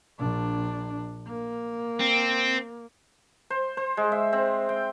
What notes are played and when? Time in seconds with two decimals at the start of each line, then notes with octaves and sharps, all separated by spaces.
0.18 A#1 D4
1.27 A#3
2.00 C4
3.50 C5
3.77 C5
3.97 G#3
4.12 E5
4.33 C4
4.69 G5